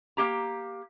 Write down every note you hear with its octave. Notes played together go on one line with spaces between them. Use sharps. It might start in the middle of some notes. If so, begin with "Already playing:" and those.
A#3 G4 A#5